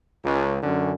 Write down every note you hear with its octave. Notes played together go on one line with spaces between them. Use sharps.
C#2
F#2 D3 C#4